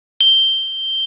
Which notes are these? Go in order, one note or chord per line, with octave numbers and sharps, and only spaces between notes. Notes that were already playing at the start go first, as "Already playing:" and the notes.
G7